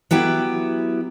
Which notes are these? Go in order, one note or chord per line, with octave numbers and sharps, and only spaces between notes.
F#3 B3 E4 G4